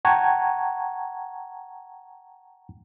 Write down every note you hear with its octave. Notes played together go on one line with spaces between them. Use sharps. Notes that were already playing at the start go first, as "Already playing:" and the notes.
F#5 G5 A5 A#5 C#6 G#6